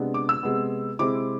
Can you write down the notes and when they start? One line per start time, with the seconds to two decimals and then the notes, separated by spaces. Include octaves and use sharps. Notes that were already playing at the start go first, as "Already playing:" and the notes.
Already playing: C3 G#3 B3 D4
0.14 D6
0.29 E6
0.43 C3 G#3 B3
0.99 C3 G#3 C4 E4 D6